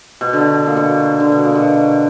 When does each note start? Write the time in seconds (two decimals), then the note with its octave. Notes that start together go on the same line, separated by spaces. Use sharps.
0.21 B2
0.33 D3
0.67 A#2
0.77 B2
1.20 D3
1.32 B2
1.44 A#2
1.55 B2